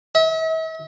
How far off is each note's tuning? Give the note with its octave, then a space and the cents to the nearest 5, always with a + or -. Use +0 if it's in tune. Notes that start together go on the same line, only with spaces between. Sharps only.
E5 -45